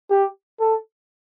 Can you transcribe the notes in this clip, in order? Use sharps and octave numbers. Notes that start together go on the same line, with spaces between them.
G4
A4